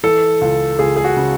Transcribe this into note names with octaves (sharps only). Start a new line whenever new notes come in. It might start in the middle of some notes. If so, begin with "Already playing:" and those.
E3 A4
C#2
C#2 G#4
G#4
F#4
C#3